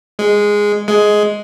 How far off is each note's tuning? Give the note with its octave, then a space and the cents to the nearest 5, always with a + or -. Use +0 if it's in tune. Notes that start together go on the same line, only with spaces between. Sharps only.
G#3 -5
G#3 +10